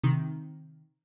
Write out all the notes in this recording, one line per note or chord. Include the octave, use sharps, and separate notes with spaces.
C3 D#3